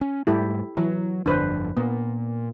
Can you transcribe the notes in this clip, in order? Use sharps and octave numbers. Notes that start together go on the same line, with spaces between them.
C#4
G#2 G3 A3 E4 G4 A4
E3 F#3
G1 F2 D3 D4 B4 C5
A#2 A#3 B3